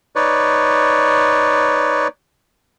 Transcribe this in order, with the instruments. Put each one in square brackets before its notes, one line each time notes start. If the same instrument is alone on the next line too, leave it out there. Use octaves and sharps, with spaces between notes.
[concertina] D#4 B4 C#5 D5